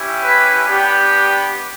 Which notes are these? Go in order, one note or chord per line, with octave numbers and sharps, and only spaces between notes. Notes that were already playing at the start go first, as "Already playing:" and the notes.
Already playing: C#4 E4 G4
B4
B3 D4 G4